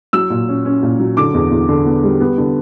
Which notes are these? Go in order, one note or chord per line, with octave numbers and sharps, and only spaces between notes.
F#3 E6
A#2
C#4
C#4
A#2
F#3
D3 D6
E2
E2
D3
B3
G3
B3
D3